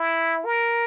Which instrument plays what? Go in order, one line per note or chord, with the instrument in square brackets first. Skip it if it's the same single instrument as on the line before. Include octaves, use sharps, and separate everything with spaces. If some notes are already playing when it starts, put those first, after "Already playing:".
Already playing: [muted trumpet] E4
A#4